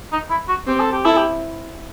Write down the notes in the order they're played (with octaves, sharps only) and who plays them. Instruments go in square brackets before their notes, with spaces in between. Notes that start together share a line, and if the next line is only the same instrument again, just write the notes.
[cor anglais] D#4
E4
F#4
[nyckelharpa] C4 [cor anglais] G4
[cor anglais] A4
G4
[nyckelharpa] E4 [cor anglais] A4
[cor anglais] G4